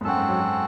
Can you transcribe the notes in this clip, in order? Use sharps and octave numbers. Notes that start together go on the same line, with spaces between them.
G#2
F#2 C4 F#4 A4
G#2
F#3
F#3